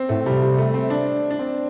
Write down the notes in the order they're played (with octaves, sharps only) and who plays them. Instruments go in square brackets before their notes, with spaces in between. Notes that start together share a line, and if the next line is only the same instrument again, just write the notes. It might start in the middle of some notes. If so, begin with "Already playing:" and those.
Already playing: [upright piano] C4
[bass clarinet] A2 [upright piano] A3
[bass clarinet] C3 [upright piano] G3
[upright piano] G3
A3
C4
D4
D4
C4